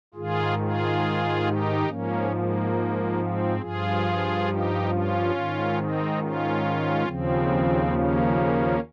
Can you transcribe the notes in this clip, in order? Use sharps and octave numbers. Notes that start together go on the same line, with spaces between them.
G#2 D#3 F4 G#4
F4 G#4
D#4 G4
G#2 F3 A#3 C#4
A#3
C4
G2 F3 F4 G#4
D#4 G4
C#4 F4
G#2 D#3
C4 D#4
C#4 F4
D#2 C#3 F3 C4
A#3 C#4